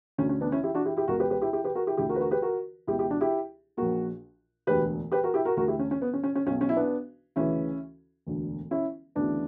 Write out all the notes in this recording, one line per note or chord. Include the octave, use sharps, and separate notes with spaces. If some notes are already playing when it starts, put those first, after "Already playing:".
D2 D3 C#4
C#4
B3 D4
C#4 E4
E4 G4
D4 F#4
E4 G4
E4 G4
C#2 B2 F#4 A#4
G4 B4
G4 B4
E4 G4
E4 G4
G4 B4
F#4 A#4
E4 G4
D2 D3 E4 G4
F#4 A#4
B4
F#4 A#4
G4 B4
F#4 A#4
C#2 B2 E4 G4
E4 G4
D4 F#4
E4 G4
A#1 A#2 F#4 A#4
E1 D2 D3 G4 B4
G4 B4
F#4 A#4
E4 G4
F#4 A#4
D2 D3 F#4 A#4
E4 G4
C#4
C#4
B3
C#4
C#4
C#4
B1 B2 C#4
C#4
E4
B3 D4
D2 C#3 E3 C#4 E4
E1 D2 D3
C#4 E4
D2 C#3 E3 B3 D4